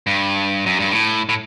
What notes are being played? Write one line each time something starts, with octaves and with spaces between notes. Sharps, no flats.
G2
F#2
G2
A2
A2